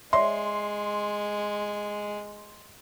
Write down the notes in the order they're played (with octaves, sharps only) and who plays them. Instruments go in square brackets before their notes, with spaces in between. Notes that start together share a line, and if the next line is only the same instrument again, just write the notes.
[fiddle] G#3 [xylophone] C#5 D5 E5 [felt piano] C6